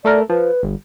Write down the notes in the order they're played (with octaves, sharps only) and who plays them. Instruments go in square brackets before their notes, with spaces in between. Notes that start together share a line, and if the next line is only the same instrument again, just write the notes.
[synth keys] A3 A4 A#4 [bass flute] D5
[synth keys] F3 [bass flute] B4
[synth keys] G1